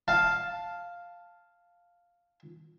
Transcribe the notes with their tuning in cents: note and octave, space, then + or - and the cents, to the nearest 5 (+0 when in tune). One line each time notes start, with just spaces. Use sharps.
F5 +0 A5 +0